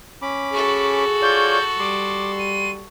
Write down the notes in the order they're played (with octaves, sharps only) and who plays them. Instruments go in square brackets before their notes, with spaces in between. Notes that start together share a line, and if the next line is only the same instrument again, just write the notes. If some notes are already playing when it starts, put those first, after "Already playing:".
[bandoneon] C#4 B5 D6
[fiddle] F#4 A4 [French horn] G#4
[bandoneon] F4 C#5 D5 [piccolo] G6
[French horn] G3 [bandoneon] C6 [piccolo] D6
[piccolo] D#7